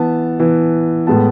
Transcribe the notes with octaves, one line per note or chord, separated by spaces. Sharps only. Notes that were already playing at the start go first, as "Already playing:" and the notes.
Already playing: E3 B3 A5
E3 B3
A2 G#3 B3 A5